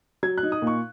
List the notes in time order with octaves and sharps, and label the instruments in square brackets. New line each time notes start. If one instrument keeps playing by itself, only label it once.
[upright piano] F#3 G#6
F#6
D#4
D#6
A#2
C#6